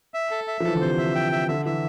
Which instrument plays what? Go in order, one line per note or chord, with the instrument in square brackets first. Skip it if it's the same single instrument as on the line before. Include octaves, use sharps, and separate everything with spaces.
[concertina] E5
A4
E5
[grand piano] F3
[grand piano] E3 [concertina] A4
[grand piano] D3
[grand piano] C3 [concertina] C5
[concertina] E5
G5
E5
[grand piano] D3 [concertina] E5
[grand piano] E3 [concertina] E5